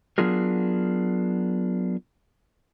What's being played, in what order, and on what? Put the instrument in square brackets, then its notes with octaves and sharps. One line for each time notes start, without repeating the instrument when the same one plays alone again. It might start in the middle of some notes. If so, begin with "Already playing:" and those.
[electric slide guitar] F#3 B3 D4 F4 G#4 A#4